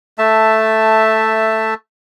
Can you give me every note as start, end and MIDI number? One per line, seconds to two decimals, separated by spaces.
0.18 1.74 57
0.18 1.74 76
0.18 1.74 81